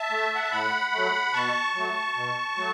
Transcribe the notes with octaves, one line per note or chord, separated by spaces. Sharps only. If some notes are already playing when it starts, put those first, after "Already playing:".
Already playing: E5 A5
A3
F#5
A5
A2 F#5 B5
F#3 A3
B2 A5 C#6
F#3 A3
B2
F#3 A3